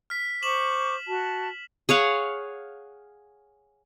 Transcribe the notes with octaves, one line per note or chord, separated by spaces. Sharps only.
F6 B6
C5 C#6 D6 E7 F#7
F#4 A5
G#4 C#5 F5 F#5